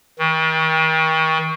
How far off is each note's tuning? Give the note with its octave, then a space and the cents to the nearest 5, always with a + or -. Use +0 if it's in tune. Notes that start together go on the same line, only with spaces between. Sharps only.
D#3 +40